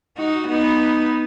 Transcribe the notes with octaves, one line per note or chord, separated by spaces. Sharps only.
D#4 F#4
B3 D#4